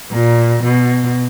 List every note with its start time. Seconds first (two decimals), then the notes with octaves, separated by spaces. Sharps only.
0.13 A#2
0.63 B2